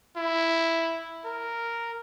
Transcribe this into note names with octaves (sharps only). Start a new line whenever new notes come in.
E4
A#4